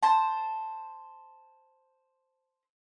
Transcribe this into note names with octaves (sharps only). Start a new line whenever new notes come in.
C5 A5